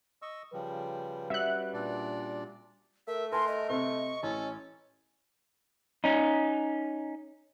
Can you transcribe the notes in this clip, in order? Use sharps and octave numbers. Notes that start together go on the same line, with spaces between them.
D#5 C#6 E6
C#3 F3 G3 B4
G3 C#4 F#4 E5 F#6
A#2 D4 D5
A3 A#4 E5
A#4 B4 G#5 A5 C6
D#5
C3 C4 C#6 F6
A1 C#4 A4
C#4 D#4